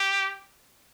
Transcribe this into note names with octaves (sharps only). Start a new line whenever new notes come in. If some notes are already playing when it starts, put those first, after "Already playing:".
Already playing: G4